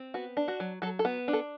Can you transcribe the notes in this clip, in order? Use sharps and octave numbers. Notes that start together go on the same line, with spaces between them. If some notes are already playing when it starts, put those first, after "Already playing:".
Already playing: C4
B3 F#4
D4
F#4
F#3
F#3 A4
A4
B3
D4
A4